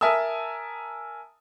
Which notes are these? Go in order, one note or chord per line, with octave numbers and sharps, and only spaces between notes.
A#4 E5 G#5 A5 D#6 E6